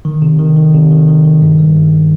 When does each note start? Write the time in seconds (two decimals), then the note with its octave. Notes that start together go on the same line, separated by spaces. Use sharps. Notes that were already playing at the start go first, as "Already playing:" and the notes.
0.05 D#3
0.22 C3
0.39 D#3
0.56 D#3
0.74 C3
0.91 D#3
1.08 D#3
1.24 D#3
1.42 G2
1.59 G3
1.77 G2